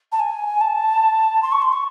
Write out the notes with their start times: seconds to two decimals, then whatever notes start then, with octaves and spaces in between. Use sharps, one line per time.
0.12 A5
0.20 G#5
0.61 A5
1.42 C6
1.52 C#6
1.62 C6
1.72 C#6